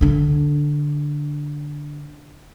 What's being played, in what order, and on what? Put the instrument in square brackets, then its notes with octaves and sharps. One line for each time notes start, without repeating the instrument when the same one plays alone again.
[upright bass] D3 D4